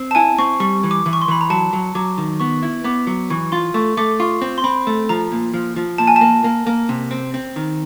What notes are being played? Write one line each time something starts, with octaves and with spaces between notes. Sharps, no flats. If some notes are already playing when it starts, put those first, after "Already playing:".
Already playing: C4
A5
E4 G#5
C4 C#6
G3 C#6
E3
D6
E3
C#6
C6
E3 B5
A#5
F#3 A5
F#3
F#3 D6
D#3
B3 C#6
E4
B3 D6
F#3
E3 C#6
F4 C6
A3 C#6
A3 D6
F4 C#6
C4
C6
C4 B5
A3
F3 A#5
A#2
F3
F3
A#2 A5
G#5
A5
A#3
A#3
A#3
C3
C4
C4
D#3